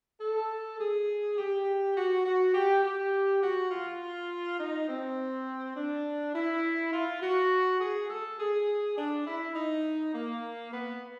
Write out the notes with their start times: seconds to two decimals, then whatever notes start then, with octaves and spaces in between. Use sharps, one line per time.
0.20 A4
0.79 G#4
1.38 G4
1.96 F#4
2.26 F#4
2.55 G4
2.83 G4
3.42 F#4
3.71 F4
4.60 D#4
4.89 C4
5.76 D4
6.34 E4
6.93 F4
7.22 F#4
7.80 G#4
8.09 A4
8.39 G#4
8.97 D4
9.27 E4
9.55 D#4
10.14 A#3
10.72 B3